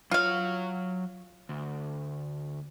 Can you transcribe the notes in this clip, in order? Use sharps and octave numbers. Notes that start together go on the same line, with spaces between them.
F#3 F4 C#5 F5
D2